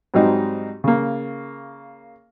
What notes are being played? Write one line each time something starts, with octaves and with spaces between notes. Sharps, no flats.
G#2 F#3 G3 C4 D#4
C#3 A#3